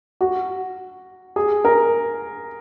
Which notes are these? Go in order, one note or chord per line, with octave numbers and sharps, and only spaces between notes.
F#4
G#4
A#4